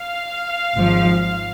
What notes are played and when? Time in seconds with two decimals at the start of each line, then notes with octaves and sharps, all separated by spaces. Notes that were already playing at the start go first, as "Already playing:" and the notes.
Already playing: F5
0.74 G#1 G#2 F3